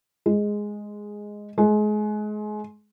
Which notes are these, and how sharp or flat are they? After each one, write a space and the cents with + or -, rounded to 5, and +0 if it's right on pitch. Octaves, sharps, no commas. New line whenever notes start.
G#3 +0
G#3 +30